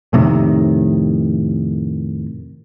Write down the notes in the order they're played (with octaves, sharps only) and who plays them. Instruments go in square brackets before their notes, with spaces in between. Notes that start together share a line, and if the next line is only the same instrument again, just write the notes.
[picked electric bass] F2 A2 C3 D#3